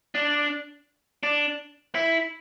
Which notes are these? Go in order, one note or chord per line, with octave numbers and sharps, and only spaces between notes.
D4
D4
E4